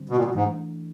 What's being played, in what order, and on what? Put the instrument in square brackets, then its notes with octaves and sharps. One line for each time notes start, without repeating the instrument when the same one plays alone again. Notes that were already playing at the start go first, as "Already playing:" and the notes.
Already playing: [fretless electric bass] D3 G3 C4
[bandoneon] B2
A#2
B2
[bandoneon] G#2 [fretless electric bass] E3 A3 D4